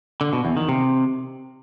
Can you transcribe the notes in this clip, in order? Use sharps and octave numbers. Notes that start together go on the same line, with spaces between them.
D3
B2
E2
D#3
C3